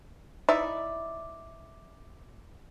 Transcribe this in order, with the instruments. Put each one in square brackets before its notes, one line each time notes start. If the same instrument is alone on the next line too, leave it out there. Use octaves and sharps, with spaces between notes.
[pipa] D#4 E4 D5 E5